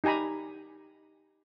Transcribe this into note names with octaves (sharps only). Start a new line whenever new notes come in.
D#4 G4 G#5 A#5 B5